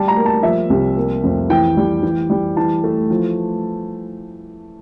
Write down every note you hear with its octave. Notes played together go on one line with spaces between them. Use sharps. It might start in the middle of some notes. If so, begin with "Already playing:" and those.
Already playing: G3 A5
A#5
A#3
A5
F3 E5
C2
A#3
F2
E3 G5
G3
E3
G3
E3 A5
A3
F3